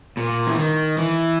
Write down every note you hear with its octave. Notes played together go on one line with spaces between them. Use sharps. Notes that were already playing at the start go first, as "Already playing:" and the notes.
A#2
E3
D#3
E3